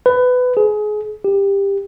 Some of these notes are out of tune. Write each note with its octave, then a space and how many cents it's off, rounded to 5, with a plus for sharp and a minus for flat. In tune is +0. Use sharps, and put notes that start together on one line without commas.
B4 +20
G#4 +25
G4 +20